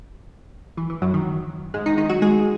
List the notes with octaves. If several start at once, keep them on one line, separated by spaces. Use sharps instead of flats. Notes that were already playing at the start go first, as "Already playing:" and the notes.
E3
E3
F#2 F#3
D#3
G#2 G#3
D#3 D#4
D#3 D#4
F#3 F#4
G#3 G#4